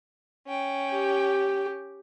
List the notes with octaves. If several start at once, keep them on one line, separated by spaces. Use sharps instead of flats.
C#4 G5
G4